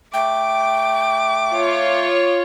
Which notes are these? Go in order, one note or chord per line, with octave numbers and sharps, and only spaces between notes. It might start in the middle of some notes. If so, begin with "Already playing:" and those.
A3 G5 D6
F4 C#5